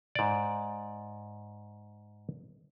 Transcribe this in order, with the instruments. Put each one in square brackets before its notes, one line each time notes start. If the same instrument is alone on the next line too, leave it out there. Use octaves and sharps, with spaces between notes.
[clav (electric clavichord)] G#2 D5